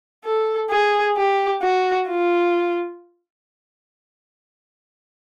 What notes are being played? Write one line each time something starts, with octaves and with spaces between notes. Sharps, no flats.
A4
G#4
G4
F#4
F4